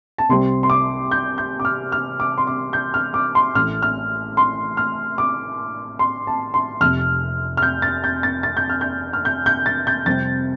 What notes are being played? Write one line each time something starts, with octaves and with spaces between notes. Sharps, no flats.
A5
C2 C3 G3 C4 C6
C6
D6
G6
G6
D6
F6
F6
D6
C6
D6
G6
F6
D6
C6
A1 A2 A3 F6
F6
C6
F6
D6
C6
A5
C6
F1 F2 C3 F6
F6
G6
A6
G6
A6
A6
G6
F6
G6
F6
G6
G6
A6
G6
F2 C3 G3 C4 A6